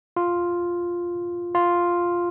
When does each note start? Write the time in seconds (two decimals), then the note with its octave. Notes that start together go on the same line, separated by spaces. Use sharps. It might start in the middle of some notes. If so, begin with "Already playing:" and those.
0.16 F4
1.55 F4